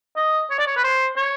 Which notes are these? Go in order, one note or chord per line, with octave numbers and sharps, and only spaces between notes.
D#5
C#5
D5
C#5
B4
C5
C#5